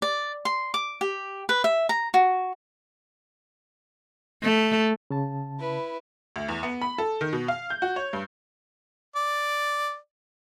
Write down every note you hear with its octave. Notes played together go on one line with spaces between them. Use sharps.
D5
C6
D6
G4
B4
E5
A#5
F#4
A3
C#3 A5
E4 B4
D2
E2
B3
B5
A4
D#3
B2
F5
G6
F#4
C#5
G2
D5